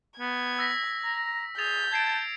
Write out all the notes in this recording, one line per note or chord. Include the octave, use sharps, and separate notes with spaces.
B3 G#6
E6 A#6 B6
A#5
G#4 G6 A6 F7
A5 G#6 C7 D7